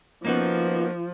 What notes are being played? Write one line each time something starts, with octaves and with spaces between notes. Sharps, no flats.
F3 A#3 B3 C#4 D#4 F#4